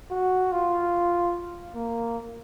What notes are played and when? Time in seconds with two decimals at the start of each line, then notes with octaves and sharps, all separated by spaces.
0.11 F#4
0.52 F4
1.74 A#3